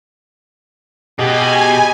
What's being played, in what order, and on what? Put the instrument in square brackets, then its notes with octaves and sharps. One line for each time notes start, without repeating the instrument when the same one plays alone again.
[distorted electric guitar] B2 [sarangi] G4 [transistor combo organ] G#4 D#5 [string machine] G#5